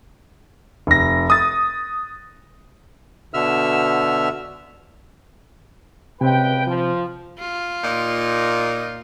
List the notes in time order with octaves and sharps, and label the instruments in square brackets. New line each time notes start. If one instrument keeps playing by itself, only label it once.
[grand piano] F1 A#6
D#6 A6
[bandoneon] B2 D3 E5 E6 F6
[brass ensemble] C#2 B4 G5 [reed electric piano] C3 C4
[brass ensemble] F3
[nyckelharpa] F4
[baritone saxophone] A#2 [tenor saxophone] D#4